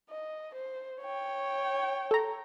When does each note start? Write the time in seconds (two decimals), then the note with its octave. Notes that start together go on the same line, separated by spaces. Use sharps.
0.10 D#5
0.55 C5
1.02 C#5 G5
2.11 A4 A#5